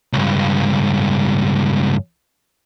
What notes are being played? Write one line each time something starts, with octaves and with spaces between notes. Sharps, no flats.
C#2 G2